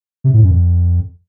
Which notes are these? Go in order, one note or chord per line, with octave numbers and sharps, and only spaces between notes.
C3
A2
F#2
F2